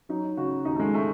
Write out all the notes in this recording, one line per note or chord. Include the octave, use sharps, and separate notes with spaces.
F#3 D#4
C#3 F#4
D#2 D#4
A3
G#3
A3